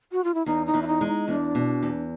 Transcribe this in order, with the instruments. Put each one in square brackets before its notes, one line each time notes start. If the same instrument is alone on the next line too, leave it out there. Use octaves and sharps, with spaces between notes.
[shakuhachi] F#4
F4
E4
[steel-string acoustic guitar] E2 [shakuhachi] D#4
[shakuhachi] D#4
[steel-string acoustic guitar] E2
[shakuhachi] E4
D#4
[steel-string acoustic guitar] G#3
[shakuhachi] D#4
[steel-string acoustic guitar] E2 [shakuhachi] D4
[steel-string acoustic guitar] B2
E2